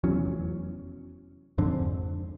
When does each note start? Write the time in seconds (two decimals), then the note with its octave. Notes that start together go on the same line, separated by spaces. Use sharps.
0.04 F1 E2 F#3 C#4
1.58 F2 G#2 D3 C4